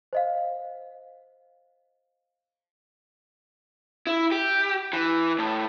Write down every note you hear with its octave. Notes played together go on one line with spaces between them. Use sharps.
C5 D#5 F5
E4
G4
E3
A2